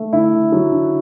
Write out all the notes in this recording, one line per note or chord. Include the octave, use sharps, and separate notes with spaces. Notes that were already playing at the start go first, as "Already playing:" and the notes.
Already playing: A3
D3 E4
D3
F#3
D3